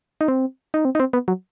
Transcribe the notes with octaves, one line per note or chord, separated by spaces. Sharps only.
D#4
C4
D#4
C4
D#4
C4
B3
F#3